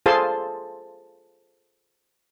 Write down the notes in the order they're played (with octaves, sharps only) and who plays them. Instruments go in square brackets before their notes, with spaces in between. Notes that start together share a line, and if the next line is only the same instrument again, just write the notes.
[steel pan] F4 G#4 A4 C5 A5 C6